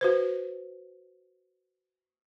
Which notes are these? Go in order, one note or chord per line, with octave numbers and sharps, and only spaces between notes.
F#4 B4 C5